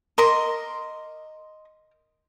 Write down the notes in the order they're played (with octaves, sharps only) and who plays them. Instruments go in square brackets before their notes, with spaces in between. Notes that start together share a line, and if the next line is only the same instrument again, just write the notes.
[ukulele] A#4 [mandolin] D#5 C6 D6